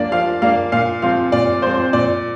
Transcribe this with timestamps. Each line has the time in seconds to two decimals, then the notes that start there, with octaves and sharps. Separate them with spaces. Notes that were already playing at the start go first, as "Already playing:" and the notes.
Already playing: F3 A#3 D4 D5
0.12 F3 F5
0.42 A#3 D4 F5
0.72 A#2 F5
1.02 F3 C4 F5
1.32 A#2 D5
1.62 F3 C4 C5
1.93 A#2 D5